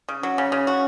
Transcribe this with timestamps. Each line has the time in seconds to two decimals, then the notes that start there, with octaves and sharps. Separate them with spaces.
0.09 C#3
0.23 F#3 C#4
0.38 C#3
0.52 C#3
0.67 F#4